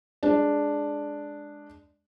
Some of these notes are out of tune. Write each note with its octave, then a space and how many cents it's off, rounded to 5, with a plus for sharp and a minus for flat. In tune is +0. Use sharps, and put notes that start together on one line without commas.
G#3 +0 D4 +0